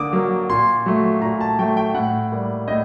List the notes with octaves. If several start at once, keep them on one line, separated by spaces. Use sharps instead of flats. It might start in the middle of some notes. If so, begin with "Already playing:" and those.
Already playing: D3 A#3 D6 D#6
F#3 A#3
A#2 C6
F#3 A3
A#2 A#5
A5
F#3 A3 G5
G5
A2 F#5
G3 A#3
A2 D#5